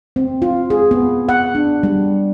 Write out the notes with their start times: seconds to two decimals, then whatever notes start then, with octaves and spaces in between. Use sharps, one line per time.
0.16 C4
0.42 F4
0.70 G#4
0.91 B3
1.29 F#5
1.55 D4
1.83 G3